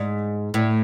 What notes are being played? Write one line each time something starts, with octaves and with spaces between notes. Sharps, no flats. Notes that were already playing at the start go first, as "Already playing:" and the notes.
Already playing: G#2
A2